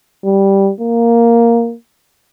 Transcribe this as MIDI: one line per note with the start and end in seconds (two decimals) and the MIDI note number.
0.24 0.71 55
0.80 1.75 58